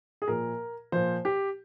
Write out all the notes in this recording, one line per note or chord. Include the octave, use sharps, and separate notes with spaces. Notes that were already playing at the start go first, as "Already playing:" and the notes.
G#4
A#2 F3 A#4
A#2 F3 C5
G4